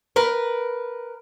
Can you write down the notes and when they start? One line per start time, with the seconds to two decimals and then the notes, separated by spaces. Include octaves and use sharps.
0.16 A#4 B4